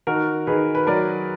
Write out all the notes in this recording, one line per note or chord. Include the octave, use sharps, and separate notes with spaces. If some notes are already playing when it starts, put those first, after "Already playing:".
D#3 F#4 A#4
D#3 G#4 B4
B4
F#3 A#4 D5